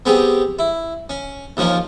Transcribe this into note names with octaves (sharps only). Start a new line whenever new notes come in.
B3 C4 G4 G#4
E4
C#4
D#2 F3 A#3 C#4 F4